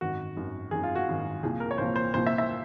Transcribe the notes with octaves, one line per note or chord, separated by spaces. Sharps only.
G#1 F#2 D#3 F#4
G#1 F#2 D#3
G#1 F#2 D#3 G#4
F4
F#4
G#1 F#2 D#3
C2 A#2 F3 G#4
A#4
C#5
C2 A#2 F3 C5
C5
C2 A#2 F3 C5
E5
E5